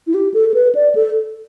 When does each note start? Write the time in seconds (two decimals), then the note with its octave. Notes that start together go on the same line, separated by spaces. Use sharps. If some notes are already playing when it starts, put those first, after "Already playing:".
0.07 E4
0.14 G4
0.34 A4
0.49 A4
0.54 B4
0.75 D5
0.95 A4